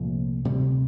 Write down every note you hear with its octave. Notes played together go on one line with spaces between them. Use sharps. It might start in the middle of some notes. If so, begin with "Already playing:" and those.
Already playing: C2 A#2 F3 A3
D2 C3 G3